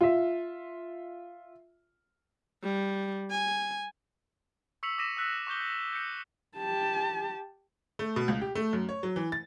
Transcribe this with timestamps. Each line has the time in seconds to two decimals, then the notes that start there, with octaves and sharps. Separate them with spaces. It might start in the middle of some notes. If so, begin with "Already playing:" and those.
0.01 F4 E5
2.63 G3
3.31 G#5
4.83 C#6 E6 B6 C#7 F7 F#7
4.98 D6 D#6 A#6 B6 D#7 E7
5.17 E6 F#6 B6
5.47 C#6 D6 G6 G7
5.61 F#6
5.93 G6 C#7
6.57 G4 A5
7.99 A3
8.16 B2
8.28 C#2
8.41 G4
8.55 A3
8.73 F#2
8.89 C#5
9.03 F#3
9.16 E3
9.32 A6